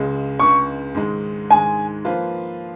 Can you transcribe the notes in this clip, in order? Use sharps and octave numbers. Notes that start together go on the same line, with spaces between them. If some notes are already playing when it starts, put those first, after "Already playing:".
Already playing: C#2 C#3 G#3
C#2 C#3 G#3 C#6
G#2 D#3 G#3
G#2 D#3 G#3 G#5
F3 A#3 F4 B4